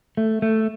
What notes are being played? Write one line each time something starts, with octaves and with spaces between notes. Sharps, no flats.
A3
A3